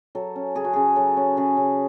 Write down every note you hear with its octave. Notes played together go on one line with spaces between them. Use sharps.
F#3 A4
C#4
C#3 G#4
F#4
C#3 G#4
F#3 A4
C#4
C#3 G#4
C#3